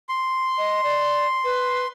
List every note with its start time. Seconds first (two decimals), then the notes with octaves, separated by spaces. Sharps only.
0.09 C6
0.58 D#5
0.84 D5
1.44 B4